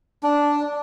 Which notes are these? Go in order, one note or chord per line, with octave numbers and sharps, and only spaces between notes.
D4